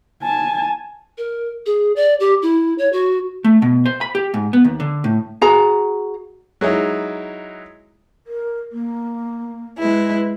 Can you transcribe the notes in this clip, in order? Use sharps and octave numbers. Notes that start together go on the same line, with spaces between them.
G#5 A5
A#4
G#4
D5
G4
E4
C#5
F#4
A3
B2
C5
B5
G4
G#2
B3
D#2
D3
A2
F#4 G#4 A#5
F#3 G#3 D#4 E4
A#4
A#3
G#3 E4 B4